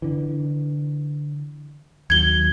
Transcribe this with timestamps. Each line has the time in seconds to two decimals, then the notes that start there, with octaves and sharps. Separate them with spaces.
0.02 D3 E3
2.10 D#2 F#3 G#6 G7